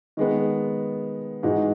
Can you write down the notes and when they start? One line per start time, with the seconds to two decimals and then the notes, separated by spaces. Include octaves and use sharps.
0.17 D#3 G#3 B3
1.43 G#2 E3 G#3 D#4 F#4